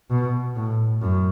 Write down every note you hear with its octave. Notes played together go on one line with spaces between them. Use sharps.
B2
A2
F#2